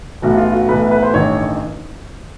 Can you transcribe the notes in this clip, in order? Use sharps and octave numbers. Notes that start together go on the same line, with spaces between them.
B1 A2 E3 F#4
F4
F#4
B1 A2 E3 B4
B4
C5
A1 G2 D#3 C#5